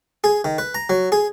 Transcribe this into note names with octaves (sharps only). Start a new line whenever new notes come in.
G#4
D#3
B4
A#5
F#3
G#4